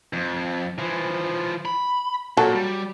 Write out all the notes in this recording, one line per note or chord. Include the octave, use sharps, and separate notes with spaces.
F2
E3 F3
B5
A#2 F#3 A4
G3